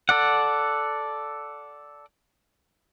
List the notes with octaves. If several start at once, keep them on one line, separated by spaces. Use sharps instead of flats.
A4 D5 F#5